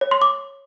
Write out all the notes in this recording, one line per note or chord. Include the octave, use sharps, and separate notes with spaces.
C#5
C6
D6